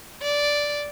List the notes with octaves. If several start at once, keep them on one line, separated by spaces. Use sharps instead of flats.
D5